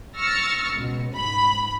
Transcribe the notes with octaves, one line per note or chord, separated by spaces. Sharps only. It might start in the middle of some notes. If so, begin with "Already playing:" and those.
C#6 E6 F6 A6 A#6 C#7
C#2 B2
G#2 B5